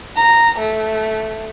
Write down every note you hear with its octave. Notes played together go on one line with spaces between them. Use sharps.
A#5
A3